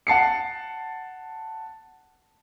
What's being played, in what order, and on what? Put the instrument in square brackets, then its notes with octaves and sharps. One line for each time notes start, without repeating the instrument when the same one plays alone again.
[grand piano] F#5 A5 C7 C#7